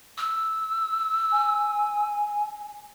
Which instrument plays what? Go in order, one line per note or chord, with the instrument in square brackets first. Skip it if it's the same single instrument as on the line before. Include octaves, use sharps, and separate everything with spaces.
[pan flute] E6
[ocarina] G#5